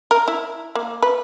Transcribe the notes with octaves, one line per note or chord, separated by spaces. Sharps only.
A#4
E4
A#3
B4